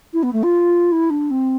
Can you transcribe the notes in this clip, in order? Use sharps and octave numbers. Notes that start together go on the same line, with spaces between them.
E4
B3
A3
F4
E4
D4
C4